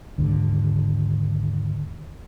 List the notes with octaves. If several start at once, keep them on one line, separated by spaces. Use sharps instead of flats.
D#2 G#2 D3